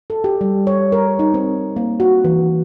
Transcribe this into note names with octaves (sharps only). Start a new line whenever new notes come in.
A4
G4
G3
C#5
A#4
D#4
C4
A#3
F#4
E3